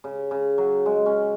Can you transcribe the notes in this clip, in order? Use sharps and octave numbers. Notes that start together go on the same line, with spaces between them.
C#3
C#3
F#3
G#3
C#4